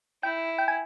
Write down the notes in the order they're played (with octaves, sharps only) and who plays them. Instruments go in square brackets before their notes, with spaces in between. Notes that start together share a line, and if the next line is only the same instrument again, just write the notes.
[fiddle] E4 [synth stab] G5
[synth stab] G5
G#5